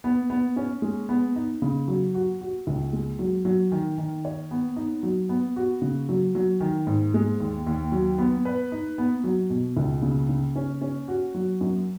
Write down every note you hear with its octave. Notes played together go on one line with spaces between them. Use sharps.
B3
B3
C#4
G#3
B3
D#4
C#3
F#3
F#4
F#4
C#2
G#3
F#3
F#3
D#3
D#3
C#5
B3
D#4
F#3
B3
F#4
C#3
F#3
F#3
D#3
G#2
G#3
D#2
D#2
F#3
B3
B4
D#4
B3
F#3
B2
C#2
C#3
C#3
C#4
C#4
F#4
F#3
F#2